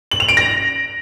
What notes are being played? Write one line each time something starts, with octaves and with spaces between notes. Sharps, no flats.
F#7
F7
D7
A#6